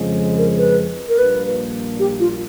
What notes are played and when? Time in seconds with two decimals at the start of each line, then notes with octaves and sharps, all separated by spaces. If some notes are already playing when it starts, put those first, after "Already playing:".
Already playing: F2 C#3 F3 G#3
0.38 A#4
0.58 B4
1.09 A#4
1.18 A#1 A#2 G3 A#3 D4 B4
1.99 G4
2.20 F4